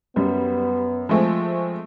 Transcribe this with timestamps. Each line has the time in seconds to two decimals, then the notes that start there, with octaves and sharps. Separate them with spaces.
0.16 F#2 G3 B3
1.09 F3 G#3 A3 C4 G#5